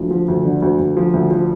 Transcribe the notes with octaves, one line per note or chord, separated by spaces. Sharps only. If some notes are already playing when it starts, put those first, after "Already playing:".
Already playing: D2 D3 F3
F3
D2
D3
D2
D2
F3
D2
F3